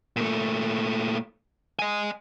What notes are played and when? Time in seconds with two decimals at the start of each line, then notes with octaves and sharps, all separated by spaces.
0.17 A#2 A3
1.79 D#5 G#5